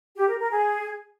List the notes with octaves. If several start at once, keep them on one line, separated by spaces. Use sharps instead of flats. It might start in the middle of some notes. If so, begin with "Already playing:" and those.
G4
A#4
A#4
G#4